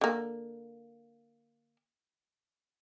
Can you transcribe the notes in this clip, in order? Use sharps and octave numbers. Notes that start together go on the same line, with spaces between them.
D3 A#3